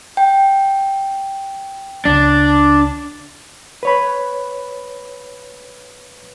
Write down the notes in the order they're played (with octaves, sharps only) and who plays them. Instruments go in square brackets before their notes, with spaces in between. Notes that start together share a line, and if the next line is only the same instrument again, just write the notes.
[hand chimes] G5
[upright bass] C#2 [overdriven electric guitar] D4
[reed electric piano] B4 C#5 B5